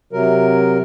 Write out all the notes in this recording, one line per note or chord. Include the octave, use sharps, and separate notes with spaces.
C3 F#3 A#4